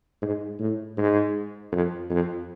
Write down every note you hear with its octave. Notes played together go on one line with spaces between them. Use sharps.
G#2
A2
G#2
F2
F2